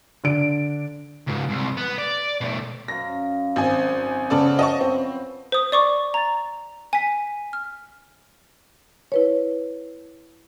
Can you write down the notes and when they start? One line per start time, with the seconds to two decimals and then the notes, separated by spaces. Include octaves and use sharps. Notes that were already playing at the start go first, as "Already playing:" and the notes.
0.24 D3 D4 D7
1.27 C#2 G#2
1.49 C2
1.77 B3
1.98 D5
2.41 B2 A3
2.88 F#2 D#5 F5 A#6
3.56 G#1 C5 G#5
4.30 C#3 F3 B3 C#4 A4 D5
4.59 D#5 A5 C#6
4.81 C4
5.52 C5 D#6
5.72 D5 C#6 D6
6.14 A#5 A6
6.93 G#5 B6
7.53 F6
9.12 E4 B4 C#5